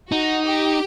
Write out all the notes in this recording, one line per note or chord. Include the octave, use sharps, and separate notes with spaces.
D#4 F#4
G4